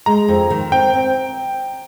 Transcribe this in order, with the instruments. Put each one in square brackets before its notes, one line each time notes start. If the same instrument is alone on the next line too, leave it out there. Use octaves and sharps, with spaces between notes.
[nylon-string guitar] G#3 [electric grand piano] A#5
[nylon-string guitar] F2
D#3
[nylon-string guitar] C4 [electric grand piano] G5
[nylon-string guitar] C4